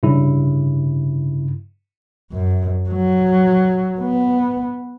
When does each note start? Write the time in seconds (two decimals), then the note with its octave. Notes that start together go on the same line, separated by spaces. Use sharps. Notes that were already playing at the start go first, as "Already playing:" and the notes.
0.03 G2 C#3 E4
2.32 F#2
2.90 F#3
4.00 B3